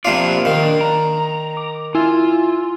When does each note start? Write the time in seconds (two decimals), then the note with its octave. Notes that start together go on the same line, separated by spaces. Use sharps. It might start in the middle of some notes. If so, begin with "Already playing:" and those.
0.05 C3 F3 A#3 D4 F4 D5
0.45 A#2 D#3 F5
0.63 D4
0.81 A#5
1.57 D6
1.95 E4 F4 G#5 E6